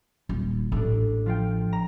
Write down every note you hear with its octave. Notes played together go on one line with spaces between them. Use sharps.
D#1
A1 A3 D4
F3 F4 G5
A#5